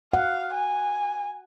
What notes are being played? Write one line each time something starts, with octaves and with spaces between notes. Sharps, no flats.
F5 F#5
G#5